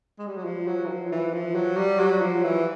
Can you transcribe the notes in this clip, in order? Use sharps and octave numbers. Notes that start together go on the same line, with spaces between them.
G#3
G3
F#3
F3
F#3
E3
F3
E3
F3
F#3
G3
F#3
F3
E3